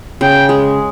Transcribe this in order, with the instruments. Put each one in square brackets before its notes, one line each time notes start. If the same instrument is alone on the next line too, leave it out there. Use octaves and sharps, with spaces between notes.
[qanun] C#3 [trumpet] G5
[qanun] G#3